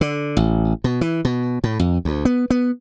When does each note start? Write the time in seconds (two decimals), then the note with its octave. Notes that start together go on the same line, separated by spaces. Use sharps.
0.01 D3
0.37 A1
0.84 B2
1.01 E3
1.25 B2
1.64 A2
1.79 F2
2.05 D2
2.25 B3
2.50 B3